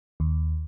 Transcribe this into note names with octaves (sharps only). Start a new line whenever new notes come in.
D#2